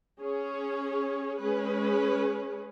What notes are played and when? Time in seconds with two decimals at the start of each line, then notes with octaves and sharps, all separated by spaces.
0.21 C#4 G#4 C#5
1.41 G#3 C#4 G#4 B4